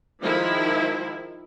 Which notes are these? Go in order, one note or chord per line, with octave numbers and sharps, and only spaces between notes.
D#3 F3 G#3 E4